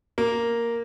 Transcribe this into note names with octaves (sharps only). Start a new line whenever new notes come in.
A#3